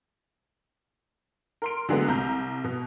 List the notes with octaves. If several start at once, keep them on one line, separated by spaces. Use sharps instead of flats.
A#4 C6 D7
D3 F#3 G#3 A3 B3
C2 A#5 G6
B2